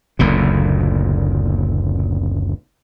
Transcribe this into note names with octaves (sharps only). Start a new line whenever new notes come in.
F#1 D2 A#2